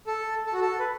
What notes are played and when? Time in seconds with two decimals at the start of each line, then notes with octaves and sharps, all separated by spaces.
0.07 A4
0.46 A4
0.53 F#4
0.61 A4
0.79 B4